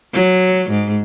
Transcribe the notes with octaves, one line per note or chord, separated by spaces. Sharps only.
F#3
G#2